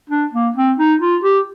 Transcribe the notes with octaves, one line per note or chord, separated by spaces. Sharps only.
D4
A#3
C4
D#4
F4
G4